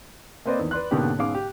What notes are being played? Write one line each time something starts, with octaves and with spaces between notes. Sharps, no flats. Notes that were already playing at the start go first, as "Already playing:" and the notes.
A#3 C4 B4 C5 D5 D#5
E2 D#3
B4 D5 C6 F#6
G#2 B2 D3 A#3 C#4 G4
G#2 B2 C#4 G#4 F5 D6
G4